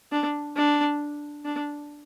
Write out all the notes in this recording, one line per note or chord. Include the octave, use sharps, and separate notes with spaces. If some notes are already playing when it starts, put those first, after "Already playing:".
D4
D4
D4